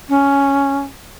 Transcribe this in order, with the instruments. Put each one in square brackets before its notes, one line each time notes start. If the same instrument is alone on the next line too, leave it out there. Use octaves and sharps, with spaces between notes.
[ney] C#4